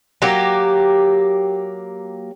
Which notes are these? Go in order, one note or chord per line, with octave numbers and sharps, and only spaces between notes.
F#3 A#3 G4